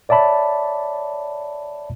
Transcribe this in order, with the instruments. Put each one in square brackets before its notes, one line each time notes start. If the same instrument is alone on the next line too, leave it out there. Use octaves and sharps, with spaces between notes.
[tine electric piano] C#5 D5 E5 A5 B5